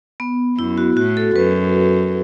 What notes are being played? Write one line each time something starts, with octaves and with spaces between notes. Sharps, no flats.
B3
F#2 E4
F#4
A2 F#4
A4
F#2 B4